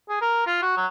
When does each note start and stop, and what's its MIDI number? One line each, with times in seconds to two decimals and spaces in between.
0.09 0.19 68
0.21 0.43 70
0.46 0.58 65
0.62 0.75 66
0.77 0.86 54